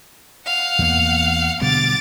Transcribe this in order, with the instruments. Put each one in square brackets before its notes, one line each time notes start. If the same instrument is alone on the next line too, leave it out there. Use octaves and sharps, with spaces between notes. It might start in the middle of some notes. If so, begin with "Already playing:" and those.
[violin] F5 F#5
[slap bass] E2 A#3
[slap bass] B2 D3 G3 [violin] D6 A6